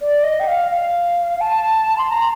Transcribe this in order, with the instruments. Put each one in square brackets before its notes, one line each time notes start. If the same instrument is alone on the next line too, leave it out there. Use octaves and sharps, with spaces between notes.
[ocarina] D5
D#5
G5
F5
F5
A5
C6
A#5